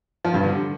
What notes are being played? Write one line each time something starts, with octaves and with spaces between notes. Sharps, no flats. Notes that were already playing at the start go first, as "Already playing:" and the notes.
F3
G2
D3